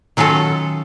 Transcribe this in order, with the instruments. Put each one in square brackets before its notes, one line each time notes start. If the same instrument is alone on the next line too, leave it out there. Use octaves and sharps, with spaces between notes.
[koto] D#3 F#3 C#4 F4 A4